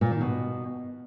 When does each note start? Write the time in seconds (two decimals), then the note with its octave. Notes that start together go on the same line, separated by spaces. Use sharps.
0.01 A#2
0.11 D#3
0.21 B2